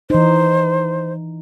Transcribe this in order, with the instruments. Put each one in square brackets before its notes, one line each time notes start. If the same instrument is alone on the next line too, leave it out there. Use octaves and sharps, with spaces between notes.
[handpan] E3 D#4 [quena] C5